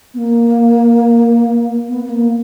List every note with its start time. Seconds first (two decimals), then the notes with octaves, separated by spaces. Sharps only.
0.14 B3
0.18 A#3
1.88 B3
2.05 B3
2.10 A#3